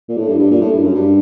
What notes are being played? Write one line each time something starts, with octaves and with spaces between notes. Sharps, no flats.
A#2
A2
G2
G2
A#2
A2
G2
F#2
G2